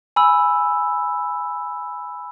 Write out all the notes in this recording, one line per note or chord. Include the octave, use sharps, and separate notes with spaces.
G#5 B5 E6